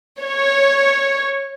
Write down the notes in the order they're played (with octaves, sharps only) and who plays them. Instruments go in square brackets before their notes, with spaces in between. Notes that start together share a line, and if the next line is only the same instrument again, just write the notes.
[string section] C#5